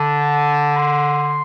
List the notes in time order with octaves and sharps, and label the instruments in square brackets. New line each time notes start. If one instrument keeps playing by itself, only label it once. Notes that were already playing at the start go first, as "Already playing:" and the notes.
Already playing: [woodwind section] D3 [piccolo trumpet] A5
[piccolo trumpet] C6